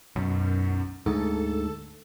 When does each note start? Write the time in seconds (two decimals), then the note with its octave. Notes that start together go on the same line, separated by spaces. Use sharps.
0.16 B1 F#2
1.06 D2 G#2 A4